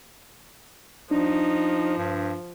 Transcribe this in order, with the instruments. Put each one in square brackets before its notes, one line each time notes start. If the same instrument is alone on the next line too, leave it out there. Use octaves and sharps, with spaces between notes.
[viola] F3 [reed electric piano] D4 [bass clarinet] D#4
[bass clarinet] G2